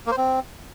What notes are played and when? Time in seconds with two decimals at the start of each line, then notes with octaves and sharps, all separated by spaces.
0.06 A#3
0.12 C5
0.17 C4